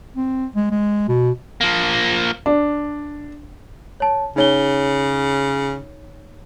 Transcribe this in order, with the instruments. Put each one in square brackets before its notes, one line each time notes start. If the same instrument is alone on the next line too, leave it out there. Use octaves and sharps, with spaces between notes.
[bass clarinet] C4
G#3
G#3
B2
[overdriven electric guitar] F3 A#3
[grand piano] D4
[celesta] C#5 A5
[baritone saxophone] C#3 [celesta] D#4 C#5 G7